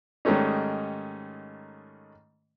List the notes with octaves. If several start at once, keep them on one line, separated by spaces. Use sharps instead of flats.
G#2 D#3 G3 A3 C#4 D#4